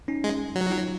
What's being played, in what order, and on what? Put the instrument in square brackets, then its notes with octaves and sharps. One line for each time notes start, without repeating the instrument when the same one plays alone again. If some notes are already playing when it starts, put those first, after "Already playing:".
[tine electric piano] C#4 D#4
[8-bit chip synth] G#3
F#3
[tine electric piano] D#4 F4